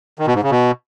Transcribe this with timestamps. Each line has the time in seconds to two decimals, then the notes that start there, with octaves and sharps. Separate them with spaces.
0.19 D#3
0.27 B2
0.35 G#2
0.43 C#3
0.51 B2